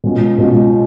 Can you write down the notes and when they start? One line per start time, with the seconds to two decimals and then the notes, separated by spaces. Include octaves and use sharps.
0.04 B2 G#3 C#4 F4
0.38 B2 G#3 C#4 F4